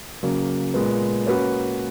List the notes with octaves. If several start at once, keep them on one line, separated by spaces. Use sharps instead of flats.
C#3 F#3 A#3
A#2 G#3 B3
A#3 C#4 F#4 B4